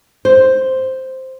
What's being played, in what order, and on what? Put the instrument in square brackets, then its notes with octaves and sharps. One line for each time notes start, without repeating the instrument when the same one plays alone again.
[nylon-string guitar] C5